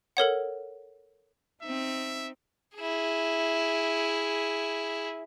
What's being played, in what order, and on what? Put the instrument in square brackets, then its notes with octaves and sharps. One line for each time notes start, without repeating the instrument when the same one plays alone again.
[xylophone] A4 A#4 C#5 F#5
[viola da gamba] C4 D#4 [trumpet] E5
[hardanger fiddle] E4 G#4